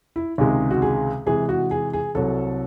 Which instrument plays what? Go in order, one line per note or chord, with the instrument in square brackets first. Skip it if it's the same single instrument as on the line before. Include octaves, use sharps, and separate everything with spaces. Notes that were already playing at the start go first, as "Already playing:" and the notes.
[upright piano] E4
[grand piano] C#2 C3 D#3 G#3 [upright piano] G#4
[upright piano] F#4
G#4
[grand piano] C3 E3 G#3 [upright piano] G#4
[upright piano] F#4
G#4
G#4
[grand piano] C2 C3 F#3 [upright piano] A4